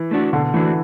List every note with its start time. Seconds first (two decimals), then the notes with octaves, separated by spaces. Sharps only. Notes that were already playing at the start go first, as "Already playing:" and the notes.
Already playing: E3
0.11 A3 D4 F#4
0.33 B2 D3
0.54 E3 A3 D4 F#4